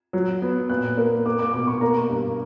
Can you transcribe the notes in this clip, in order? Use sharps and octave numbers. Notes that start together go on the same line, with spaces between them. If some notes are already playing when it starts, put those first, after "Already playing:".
F#3
B3
A#2 F#6
A#3
A#3 D6
D6
B2 D6
C#6
A#3 A#5
G2